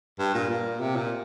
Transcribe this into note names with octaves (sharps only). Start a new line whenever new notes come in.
G2
A#2
A#2
C3
A#2